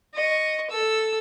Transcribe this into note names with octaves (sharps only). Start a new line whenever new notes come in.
D#5 C#6
A4 E6